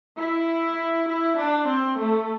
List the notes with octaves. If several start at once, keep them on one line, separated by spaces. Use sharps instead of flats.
E4
E4
D4
C4
A3